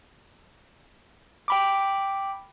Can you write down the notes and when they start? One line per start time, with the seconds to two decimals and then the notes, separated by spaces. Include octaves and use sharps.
1.48 G5 B5 D6